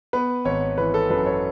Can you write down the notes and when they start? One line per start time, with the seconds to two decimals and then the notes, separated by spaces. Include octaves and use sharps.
0.13 B3 B4
0.45 G#1 C#5
0.78 E3 B4
0.94 A4
1.10 F#2 B4
1.26 C#5